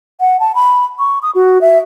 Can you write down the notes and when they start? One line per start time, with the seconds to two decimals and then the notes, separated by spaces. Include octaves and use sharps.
0.20 F#5
0.40 A5
0.55 B5
0.99 C#6
1.23 D#6
1.35 F#4
1.61 E5